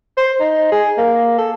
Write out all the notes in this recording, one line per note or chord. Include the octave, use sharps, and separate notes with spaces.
C5
D#4
G#4
A#3
A4